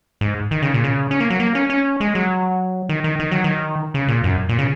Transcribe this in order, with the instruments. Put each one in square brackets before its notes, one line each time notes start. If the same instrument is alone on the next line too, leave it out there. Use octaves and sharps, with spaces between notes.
[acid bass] G#2
D#3
C#3
A#2
C#3
C#4
A#3
F#3
A#3
C#4
C#4
G#3
F#3
D#3
D#3
D#3
F#3
D#3
C#3
A#2
F#2
A#2
C#3